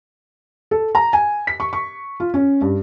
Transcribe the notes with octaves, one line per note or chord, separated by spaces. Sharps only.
A4
A#5
G#5
B6
C#6
C#6
F4
C#4
G2